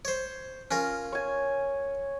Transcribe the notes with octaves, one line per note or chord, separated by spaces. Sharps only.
C5 C#5
C#4 F4 A#4
C#5 G#5